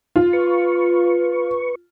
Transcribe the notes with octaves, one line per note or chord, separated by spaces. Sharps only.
F4
B4 C#6